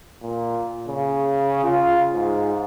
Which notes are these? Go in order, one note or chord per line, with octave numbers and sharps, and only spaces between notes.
A#2
C#3
F4
G#2